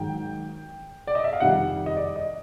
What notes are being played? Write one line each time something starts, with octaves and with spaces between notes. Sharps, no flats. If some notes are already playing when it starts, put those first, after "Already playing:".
Already playing: G#2 D#3 F#3 G5
D5
D#5
E5
F5
F2 C3 D#3 G3 F#5
D#5
D5
D#5